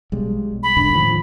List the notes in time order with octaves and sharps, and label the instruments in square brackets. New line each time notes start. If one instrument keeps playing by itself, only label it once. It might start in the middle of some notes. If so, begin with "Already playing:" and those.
[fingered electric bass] B1 G3 G#3
[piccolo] B5
[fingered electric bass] E1 G#2 D3
A2 D#3 F3